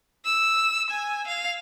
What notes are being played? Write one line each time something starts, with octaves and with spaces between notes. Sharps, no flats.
E6
G#5
F5